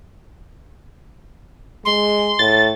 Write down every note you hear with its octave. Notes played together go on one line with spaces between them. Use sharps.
G#3 C6
A2 A6